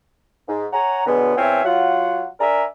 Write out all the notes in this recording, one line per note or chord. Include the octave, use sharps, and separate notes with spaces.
G#2
C#5 F#5 G#5 A#5
B2 D3 F#3 G#3 B3
E2 C4 C#5 E5 F5 G#5
F#3 F4 F#5
D4 A#4 D5 E5 G#5 A#5